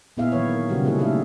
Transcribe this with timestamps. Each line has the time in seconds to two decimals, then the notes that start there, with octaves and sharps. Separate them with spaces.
0.17 A#2 B3 E4 G#4 E5 F5
0.32 D#3 E3 F#3 B4 C#5
0.49 A#4
0.69 C#3 F#3 G3 F#4 G4
0.84 C3 G#3 A#3 E4 G#4 A4
0.99 A3 D#4 G#4 A4 E5 F5